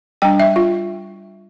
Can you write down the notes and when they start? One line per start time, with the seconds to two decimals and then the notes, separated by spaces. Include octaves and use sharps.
0.22 G3 D4 G5
0.40 E5
0.56 F4